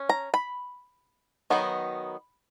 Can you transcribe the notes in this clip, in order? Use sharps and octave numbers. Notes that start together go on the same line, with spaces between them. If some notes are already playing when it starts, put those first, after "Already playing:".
Already playing: C#4
A#5
B5
D#3 F#3 B3 D#4